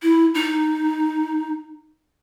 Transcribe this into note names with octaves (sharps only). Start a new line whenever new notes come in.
E4
D#4